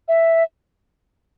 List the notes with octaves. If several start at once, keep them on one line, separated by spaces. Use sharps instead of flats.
E5